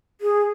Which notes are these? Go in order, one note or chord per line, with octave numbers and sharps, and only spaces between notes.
G#4